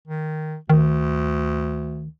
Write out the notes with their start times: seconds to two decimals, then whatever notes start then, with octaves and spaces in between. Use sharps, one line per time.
0.08 D#3
0.70 D2 D#3